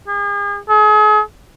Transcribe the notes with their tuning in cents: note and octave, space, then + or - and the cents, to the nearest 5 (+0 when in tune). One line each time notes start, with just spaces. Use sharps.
G#4 -40
G#4 +40